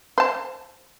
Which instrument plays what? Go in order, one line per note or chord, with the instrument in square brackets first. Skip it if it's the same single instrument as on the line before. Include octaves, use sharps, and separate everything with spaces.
[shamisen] C5 A5